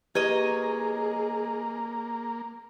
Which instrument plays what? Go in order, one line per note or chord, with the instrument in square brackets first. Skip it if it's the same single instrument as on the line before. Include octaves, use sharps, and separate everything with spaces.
[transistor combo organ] A#3 [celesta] E4 G4 B4 [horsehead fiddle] G#4 [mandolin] C#5 D#5